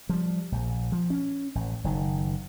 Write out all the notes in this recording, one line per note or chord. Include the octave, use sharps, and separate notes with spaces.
F3 G3
A#1
F3
C#4
A1
F#1 D#3